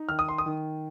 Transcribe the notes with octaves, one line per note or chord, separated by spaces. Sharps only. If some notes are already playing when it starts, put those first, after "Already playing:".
Already playing: D#4
D#3 F6
D#6
C6
D#6
D#3